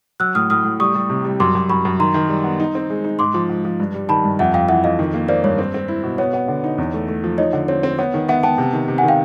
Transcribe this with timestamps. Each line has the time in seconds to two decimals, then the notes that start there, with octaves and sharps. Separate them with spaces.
0.20 F#3 E6 F#6
0.35 A2 D#6 F6
0.50 A2 D#6 F6
0.65 A2
0.80 G3 C#6 D#6
0.95 G3
1.10 C3
1.25 G3
1.40 F#2 C6 D6
1.55 F#2
1.69 F#2 B5 C#6
1.85 F#2
1.99 D#3 A#5 C6
2.14 D#3
2.29 G3
2.44 B3
2.60 D#4
2.75 C4
2.90 G#3
3.04 D#4
3.19 G#2 C6 D6
3.34 F3
3.49 G#2
3.65 F3
3.80 G2
3.94 G3
4.09 D#3 A5 B5
4.24 G2
4.39 F2 E5 F#5
4.53 F2 F5 G5
4.68 E3 E5 F#5
4.84 F2 D#5 F5
4.99 D#3
5.14 A#3
5.28 A#3 C5 D5
5.44 G2 C#5
5.58 C4
5.74 C4
5.88 E4
6.03 B2
6.18 B3 C#5
6.33 B3
6.48 D3
6.64 D#4
6.78 E2
6.94 A3
7.08 A3
7.24 F3
7.38 D#4 C#5 D#5
7.53 D3
7.68 C4 C#5
7.83 C4
7.99 B3 C#5
8.14 D#3
8.29 B3 E5 F#5
8.43 B3 G5 A5
8.58 C3
8.73 D#3
8.88 C3
8.98 F#5 G#5
9.03 D#3
9.08 F5 G5